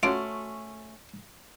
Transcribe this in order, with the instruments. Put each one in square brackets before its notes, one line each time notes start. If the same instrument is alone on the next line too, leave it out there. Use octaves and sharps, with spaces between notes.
[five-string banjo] A3 C#4 [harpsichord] F4 D6 [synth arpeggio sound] F#4 C6